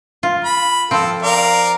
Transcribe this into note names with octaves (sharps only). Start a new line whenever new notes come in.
F4
B5
F3 C4 A4
A#4 D5 F5